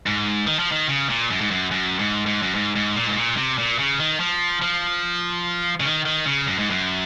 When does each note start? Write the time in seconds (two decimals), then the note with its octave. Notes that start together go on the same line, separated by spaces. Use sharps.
0.06 G#2
0.47 D#3
0.59 F3
0.72 D#3
0.89 C#3
1.09 A#2
1.30 F#2
1.41 G#2
1.51 F#2
1.71 F#2
1.99 G#2
2.26 G#2
2.42 F#2
2.55 G#2
2.76 G#2
2.96 A#2
3.07 G#2
3.16 A#2
3.37 C3
3.58 A#2
3.79 C#3
4.00 D#3
4.20 F3
4.62 F3
5.80 C#3
5.85 D#3
6.05 D#3
6.26 C#3
6.47 F#2
6.59 G#2
6.70 F#2